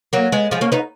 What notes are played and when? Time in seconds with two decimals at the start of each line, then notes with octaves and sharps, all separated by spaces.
0.13 F#3 A#3
0.32 G#3 B3
0.51 F3 G#3
0.61 A#3 C#4
0.72 B3 D#4